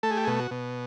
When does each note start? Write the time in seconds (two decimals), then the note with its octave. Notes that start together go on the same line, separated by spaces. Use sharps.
0.03 A3 A4
0.11 G#4
0.17 G4
0.24 G#4
0.27 B2
0.40 F#4
0.51 B2